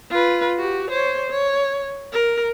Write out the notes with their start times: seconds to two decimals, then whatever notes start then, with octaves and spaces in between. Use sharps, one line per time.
0.11 F4 B4
0.57 F#4 G4
0.90 C5 C#5
1.30 C#5
2.13 A#4